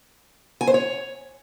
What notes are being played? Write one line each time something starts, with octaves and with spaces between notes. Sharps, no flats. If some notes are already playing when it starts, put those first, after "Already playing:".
G#5
C5
C#5